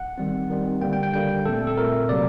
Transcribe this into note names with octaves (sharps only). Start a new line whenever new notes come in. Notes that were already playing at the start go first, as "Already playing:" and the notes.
Already playing: F#5
D#3 G3 C4
D#3 G3 C4
D3 G3 A#3 G5
G5
G5
D3 G3 A#3 G5
A#2 A3 C4 A4
A4
A#2 A3 C4 A#4
C3 F#3 A#3 D5